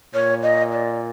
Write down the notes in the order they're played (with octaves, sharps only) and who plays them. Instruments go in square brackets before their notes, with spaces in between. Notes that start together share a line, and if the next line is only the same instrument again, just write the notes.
[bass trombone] A#2 [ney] C#5
[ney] D#5
D5